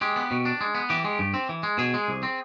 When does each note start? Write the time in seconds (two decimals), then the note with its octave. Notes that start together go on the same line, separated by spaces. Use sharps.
0.01 G#3 G4
0.16 B3
0.31 B2
0.45 D4
0.61 G#3
0.75 B3
0.90 E3 G4
1.05 G#3
1.19 G2
1.34 C4
1.49 E3
1.63 G#3
1.78 B2 G#4
1.94 G#3
2.08 C2
2.23 C4